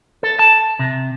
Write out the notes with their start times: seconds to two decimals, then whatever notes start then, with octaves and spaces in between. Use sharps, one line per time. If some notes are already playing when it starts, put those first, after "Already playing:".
0.23 A4
0.39 A5
0.79 C3